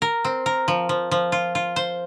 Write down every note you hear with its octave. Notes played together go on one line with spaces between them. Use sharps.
A#4
C4
A#4
F3
F3
F3
F4
F4
C5